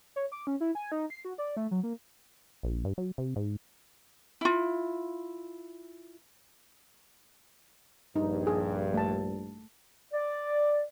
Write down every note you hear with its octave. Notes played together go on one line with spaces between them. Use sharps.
C#5
D6
C#4
E4
G#5
D#4
C7
F#4
D5
A3
F#3
A#3
A#1
G2
F#3
C3
G#2
E4 F4
A#1 G2 D#4
G#4
A3 A5
D5